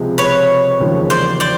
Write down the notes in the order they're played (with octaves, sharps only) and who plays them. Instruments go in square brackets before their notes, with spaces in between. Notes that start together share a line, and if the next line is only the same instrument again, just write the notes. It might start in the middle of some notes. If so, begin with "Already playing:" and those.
Already playing: [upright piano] C#2 C3 F3 G#3
[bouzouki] B4 C#5
[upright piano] E1 D#2 C#3 F3
[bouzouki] C5 D5
C5 D5